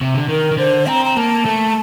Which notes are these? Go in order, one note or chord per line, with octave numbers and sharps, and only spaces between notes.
C3
D3
D#3 A#4
D#3
D3 C5
C4 A#5
A#5
A#3 A5
A3